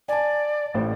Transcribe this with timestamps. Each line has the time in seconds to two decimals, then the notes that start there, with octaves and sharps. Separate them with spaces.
0.09 D5 G#5 A5
0.74 A1 A2 C5